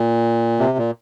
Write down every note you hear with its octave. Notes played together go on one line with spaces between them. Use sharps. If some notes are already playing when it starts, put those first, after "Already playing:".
Already playing: A#2
C3
A#2